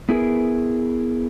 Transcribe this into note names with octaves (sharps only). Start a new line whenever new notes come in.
B3 E4 G#4 A#4